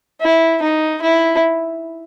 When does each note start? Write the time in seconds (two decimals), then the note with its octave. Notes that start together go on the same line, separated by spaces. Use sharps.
0.21 E4
0.62 D#4
1.02 E4